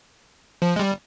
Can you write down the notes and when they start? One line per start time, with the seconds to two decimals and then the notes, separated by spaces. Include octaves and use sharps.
0.62 F3
0.76 G#3
0.79 G3